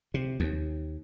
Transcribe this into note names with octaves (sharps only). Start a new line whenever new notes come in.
C3
D#2